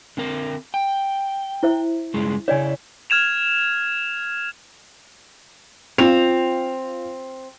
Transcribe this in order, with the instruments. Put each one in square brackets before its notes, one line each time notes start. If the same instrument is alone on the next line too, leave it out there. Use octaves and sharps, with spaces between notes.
[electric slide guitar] D3 C4 A#4
G5
[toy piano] E4 C5 E5
[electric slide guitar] G2 C#3 G#3
[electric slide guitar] C#3 E4 [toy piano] C#5 D5 G#5
[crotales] F6 G#6 E7 F7
[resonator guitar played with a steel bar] C4 [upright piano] F4 F7